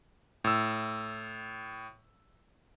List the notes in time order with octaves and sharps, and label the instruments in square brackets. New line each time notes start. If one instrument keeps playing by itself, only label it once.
[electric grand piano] A2 E6